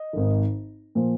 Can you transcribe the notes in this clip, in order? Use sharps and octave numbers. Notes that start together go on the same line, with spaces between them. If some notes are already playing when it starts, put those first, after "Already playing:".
Already playing: D#5
G#1 G#2 D#3
A#2 F3